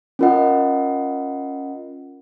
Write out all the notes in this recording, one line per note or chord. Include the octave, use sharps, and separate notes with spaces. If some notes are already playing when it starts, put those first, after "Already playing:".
C#4 F4 A#4 D#5 F#5